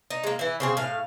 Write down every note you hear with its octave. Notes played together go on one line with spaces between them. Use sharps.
D#4
G#3 A#3
E3 E4
C#3 C4 G#4
A2 F5